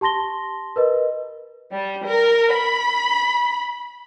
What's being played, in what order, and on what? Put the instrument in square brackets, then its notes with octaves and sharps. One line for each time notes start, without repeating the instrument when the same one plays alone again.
[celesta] G4 A5 C6 A#6 G7
A#4 B4 D#5
[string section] G3
A#4
B5